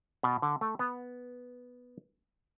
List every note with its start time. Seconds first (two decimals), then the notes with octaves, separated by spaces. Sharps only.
0.23 B2
0.42 D3
0.61 A3
0.79 B3